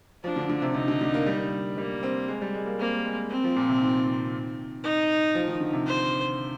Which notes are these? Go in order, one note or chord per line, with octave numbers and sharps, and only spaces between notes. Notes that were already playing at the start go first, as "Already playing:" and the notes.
F3 D4
D3
D3
C3
C3 D#4
D3
D3
A#3
G3
G3 A#3
C4
G#3
G3
G#3
A#3
A#3 C4
G#3
C4
F3
A#2
C3
D#3
D#4
F3
D#3
D3
C3
C5